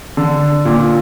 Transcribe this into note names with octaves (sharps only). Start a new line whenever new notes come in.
D3
A#2